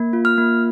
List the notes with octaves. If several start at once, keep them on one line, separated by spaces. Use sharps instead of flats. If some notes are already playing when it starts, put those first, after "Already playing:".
Already playing: A#3
F4
F6
A#3